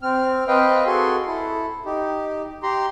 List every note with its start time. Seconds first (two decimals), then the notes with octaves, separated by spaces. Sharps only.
0.03 C4 F6
0.48 C4 B4 D#5 F5 G5
0.86 F#4 G#4 A4 C6
1.27 E4 A4
1.86 D#4 G4
2.63 G4 A#5 C6